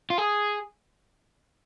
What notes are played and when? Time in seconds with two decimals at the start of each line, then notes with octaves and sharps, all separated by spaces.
0.10 F4
0.18 G#4